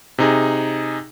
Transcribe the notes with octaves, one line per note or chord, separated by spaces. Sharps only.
C3 D#4 G#4